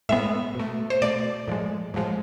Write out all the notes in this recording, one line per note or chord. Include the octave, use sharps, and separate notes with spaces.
A2 G#3 B3 E5
B2 A3
C5
B2 A3 D5
A2 F3 G#3
A2 F3 G#3